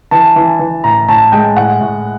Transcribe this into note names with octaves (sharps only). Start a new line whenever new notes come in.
E3 A5
E3
E3
A2 A#5
A2 A5
G#3 G5
A2 F#5
A2